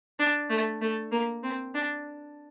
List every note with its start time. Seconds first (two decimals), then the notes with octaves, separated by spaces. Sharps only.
0.19 D4
0.50 A3
0.81 A3
1.12 A#3
1.43 C4
1.74 D4